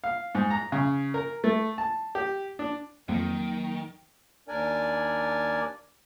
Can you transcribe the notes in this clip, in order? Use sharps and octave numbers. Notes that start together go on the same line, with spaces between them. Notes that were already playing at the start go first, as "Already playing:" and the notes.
F5
G#2
A#5
C#3
A#4
A3
A5
G4
D4
F2 D#3 F#3 A#3
D#2 D4 A#4 D5 G#5